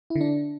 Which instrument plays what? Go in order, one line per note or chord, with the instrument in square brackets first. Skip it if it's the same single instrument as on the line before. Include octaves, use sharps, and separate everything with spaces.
[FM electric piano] E4
D3
D4